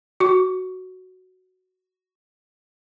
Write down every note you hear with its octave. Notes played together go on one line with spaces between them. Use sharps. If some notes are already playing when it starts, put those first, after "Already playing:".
F#4 C#6